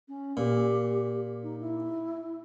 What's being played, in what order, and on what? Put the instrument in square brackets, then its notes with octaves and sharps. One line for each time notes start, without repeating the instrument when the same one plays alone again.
[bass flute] C#4
[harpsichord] A#2 [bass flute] G4
[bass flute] D#4
E4